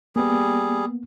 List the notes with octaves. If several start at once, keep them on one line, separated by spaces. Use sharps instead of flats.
G3 A#3 B3 G#4